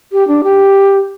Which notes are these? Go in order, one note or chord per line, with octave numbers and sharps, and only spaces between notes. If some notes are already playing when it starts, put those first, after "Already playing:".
G4
D4
G4